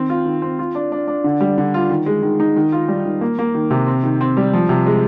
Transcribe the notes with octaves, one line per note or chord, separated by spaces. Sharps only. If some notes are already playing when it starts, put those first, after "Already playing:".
Already playing: D#3 C4
F4
D#3
C4
F4
D4
D4
D4
D3
G3
D3
F4
D#3
G#3
D#3
D#4
D#3
F4
G3
D#3
A#3
A#3
D#3
C3
C4
D#3
C4
G3
F3
C3
G#3